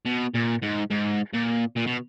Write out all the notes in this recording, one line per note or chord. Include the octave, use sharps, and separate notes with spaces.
B2
A#2
G#2
G#2
A#2
A#2
B2